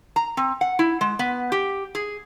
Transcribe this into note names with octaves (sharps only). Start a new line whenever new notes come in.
A#5
C4
F#5
E4
G#3
B3
G4
G#4